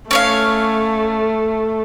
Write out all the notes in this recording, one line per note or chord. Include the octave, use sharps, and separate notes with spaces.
A3 C#4 C#5 F5